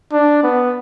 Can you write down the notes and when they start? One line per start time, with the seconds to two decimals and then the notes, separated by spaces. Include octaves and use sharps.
0.12 D4
0.44 B3